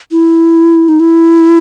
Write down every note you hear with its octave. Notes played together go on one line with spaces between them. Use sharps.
E4
D#4
E4